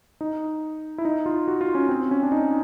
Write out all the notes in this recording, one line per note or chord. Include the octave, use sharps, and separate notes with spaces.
D#4
E4
D#4
F4
F#4
F4
C#4
C4
C#4
D4
D#4